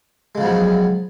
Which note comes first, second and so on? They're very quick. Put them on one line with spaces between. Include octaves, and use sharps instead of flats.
G#3 C#3 F3 B3 F#3